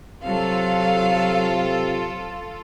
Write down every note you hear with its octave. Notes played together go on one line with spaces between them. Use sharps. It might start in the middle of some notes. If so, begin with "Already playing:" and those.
C3 F#3 F4 A4 F5